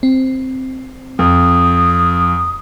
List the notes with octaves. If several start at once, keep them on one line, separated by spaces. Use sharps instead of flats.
C4
F2 D#6